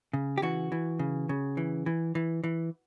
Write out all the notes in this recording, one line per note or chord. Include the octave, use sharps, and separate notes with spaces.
C#3
G4
E3 F#4
E3
C#3
C#3
E3
E3
E3
E3